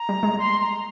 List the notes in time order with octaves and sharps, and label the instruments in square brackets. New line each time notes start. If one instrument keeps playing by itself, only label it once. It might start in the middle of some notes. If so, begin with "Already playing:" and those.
Already playing: [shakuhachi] A#5
[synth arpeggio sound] G3
G#3
[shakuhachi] C6
A#5